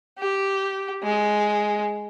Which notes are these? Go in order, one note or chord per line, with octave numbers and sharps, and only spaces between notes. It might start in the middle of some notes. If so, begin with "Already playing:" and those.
G4
G#3